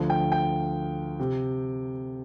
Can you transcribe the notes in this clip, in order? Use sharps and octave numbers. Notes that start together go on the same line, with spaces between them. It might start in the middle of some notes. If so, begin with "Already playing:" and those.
Already playing: D2 D3 F3
G5
G5
C3